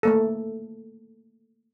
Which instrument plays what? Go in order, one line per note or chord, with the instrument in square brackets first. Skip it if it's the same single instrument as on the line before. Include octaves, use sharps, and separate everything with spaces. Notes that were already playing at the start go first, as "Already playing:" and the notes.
[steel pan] A3 A#3 A4